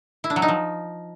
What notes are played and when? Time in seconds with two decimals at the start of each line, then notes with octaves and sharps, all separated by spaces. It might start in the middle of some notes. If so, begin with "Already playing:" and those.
0.24 E4
0.30 D4
0.36 F#3
0.42 D#4
0.48 F3